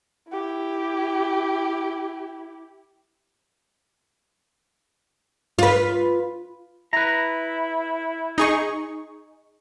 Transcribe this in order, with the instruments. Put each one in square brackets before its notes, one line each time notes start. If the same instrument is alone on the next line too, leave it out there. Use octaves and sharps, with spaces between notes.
[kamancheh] E4 G4
[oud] F4 B4
[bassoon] E4 [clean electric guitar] B4 A#5
[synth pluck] D#4 G#4 C#6